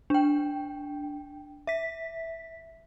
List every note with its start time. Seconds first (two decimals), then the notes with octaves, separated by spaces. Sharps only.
0.10 D4 G5
1.67 E5 B6